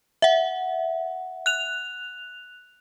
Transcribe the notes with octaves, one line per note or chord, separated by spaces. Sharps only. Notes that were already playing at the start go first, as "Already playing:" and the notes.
E5 F#5
F#6 F7